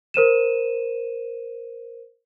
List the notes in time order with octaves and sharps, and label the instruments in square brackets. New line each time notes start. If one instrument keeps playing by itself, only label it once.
[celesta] A#4 C5 D#7 E7